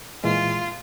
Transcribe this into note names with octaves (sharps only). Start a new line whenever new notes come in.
A#2 E3 G#3 F4